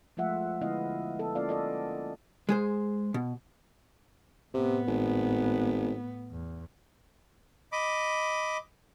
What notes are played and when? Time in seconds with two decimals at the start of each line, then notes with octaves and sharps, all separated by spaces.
0.17 F3 G#3 A3 F4 E5 F#5
0.61 D3 G#3 B3 E4 D#5 F5
1.19 B3 A4
1.35 A#3 C#4 F4 D5 F5
1.49 A4 D5 D#5
2.49 G#3 G#4 C5
3.14 B2
4.54 A2 C3 B3
4.88 G#1
6.31 E2
7.72 D#5 B5 D6